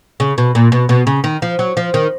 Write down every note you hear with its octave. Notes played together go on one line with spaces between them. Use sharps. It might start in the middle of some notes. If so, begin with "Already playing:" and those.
C#3
B2
A#2
B2
B2
C#3
D#3
F3
F#3
F3
D#3